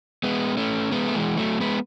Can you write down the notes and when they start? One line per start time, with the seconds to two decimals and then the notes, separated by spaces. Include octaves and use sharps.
0.24 G#3 B3
0.57 A3 C#4
0.92 G#3 B3
1.08 A3
1.15 E3 G#3
1.38 F#3 A3
1.61 G#3 B3